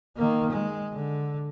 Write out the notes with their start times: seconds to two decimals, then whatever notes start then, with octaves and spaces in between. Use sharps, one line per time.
0.16 D#3 A#3
0.50 G#3
0.93 D3